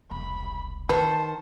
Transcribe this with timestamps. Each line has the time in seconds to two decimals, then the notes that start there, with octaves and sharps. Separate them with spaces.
0.11 E1 C2 B5
0.89 D#3 B4 C5 A5